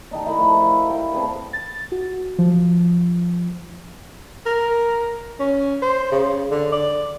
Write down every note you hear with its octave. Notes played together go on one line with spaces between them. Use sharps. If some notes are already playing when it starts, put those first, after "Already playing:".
D4 D#4 G4 G5
A3 E4 A#4 B5
F3
E4
F5 G5 C#6
C4 D4 G#4 B4
A6
F#4
F3
A#4
C#4
C5
C#3
D3
D5